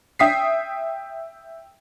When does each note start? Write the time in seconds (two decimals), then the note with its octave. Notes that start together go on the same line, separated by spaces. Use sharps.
0.19 E5 G5 D#6 B6 C7